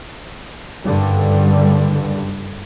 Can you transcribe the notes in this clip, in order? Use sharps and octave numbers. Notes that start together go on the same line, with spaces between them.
F#1 G2 D3 G3